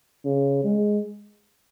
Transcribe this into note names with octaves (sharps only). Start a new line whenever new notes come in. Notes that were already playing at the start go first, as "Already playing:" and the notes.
C#3
G#3